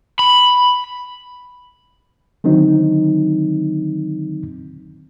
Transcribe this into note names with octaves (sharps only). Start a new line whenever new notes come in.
B5
D3 D#3 F#3 C4 D#4